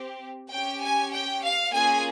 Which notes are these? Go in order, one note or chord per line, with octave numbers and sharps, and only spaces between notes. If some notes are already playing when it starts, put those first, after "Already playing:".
Already playing: C4 G4
C#4 G4 G5
G#5
G5
F5
A#3 C#4 F4 G#4 G#5